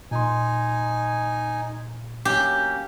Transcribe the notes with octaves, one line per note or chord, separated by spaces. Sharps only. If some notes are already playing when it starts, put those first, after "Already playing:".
A#2 D#4 G#5 C6
F#3 A#3 C#4 G4